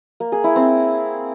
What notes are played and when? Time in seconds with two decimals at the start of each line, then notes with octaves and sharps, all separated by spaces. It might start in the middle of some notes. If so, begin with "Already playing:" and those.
0.20 A#3
0.32 G#4
0.44 E4
0.56 C4